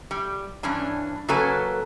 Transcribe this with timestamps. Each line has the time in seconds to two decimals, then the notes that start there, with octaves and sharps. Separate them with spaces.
0.11 G3
0.63 G2 E3 C#4 D4
1.28 C#3 F#3 A#3 A4 B4 G#5